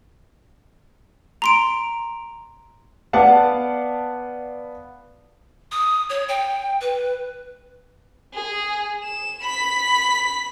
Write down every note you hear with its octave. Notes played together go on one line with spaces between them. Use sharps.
A#5 C6 D7
B3 D5 F5 F#5 A5
D#6
C#5
G5
B4
G#4
E7
B5 B6